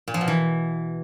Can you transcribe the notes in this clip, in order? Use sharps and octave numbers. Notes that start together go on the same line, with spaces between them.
A#2
F3
B2
E3